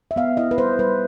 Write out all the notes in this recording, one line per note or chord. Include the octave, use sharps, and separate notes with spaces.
E5
B3 F5
E4 D#5
B4
G3 C5
G3 B4